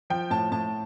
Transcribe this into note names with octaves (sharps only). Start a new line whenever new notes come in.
F3 G5
A2 A5
A2 A5